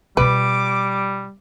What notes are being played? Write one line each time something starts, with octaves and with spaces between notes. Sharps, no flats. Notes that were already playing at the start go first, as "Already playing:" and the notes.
B2 G3 F4 B4 D6